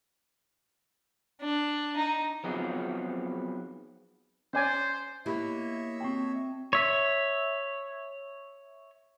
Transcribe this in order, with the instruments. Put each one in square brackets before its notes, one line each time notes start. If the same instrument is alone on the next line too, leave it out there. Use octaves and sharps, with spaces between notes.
[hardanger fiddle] D4
D#4
[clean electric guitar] F3 F#3 B3 C4 D#4 G#4
[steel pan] C#4 D5 G#5 [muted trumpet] C5
[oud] A#3 B3 [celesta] E4 G4 B5 [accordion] C#5 D#5 E5
[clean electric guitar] C4 F#4 A5 [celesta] G5 C#6
[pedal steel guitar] C#5 E5